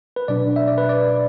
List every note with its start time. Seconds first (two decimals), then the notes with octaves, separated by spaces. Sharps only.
0.16 B4
0.28 B2 F#3 D4 D5
0.56 E5
0.68 D5
0.78 B4
0.89 D5